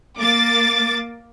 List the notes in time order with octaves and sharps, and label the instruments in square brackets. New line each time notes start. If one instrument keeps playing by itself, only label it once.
[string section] A#3 D6 A6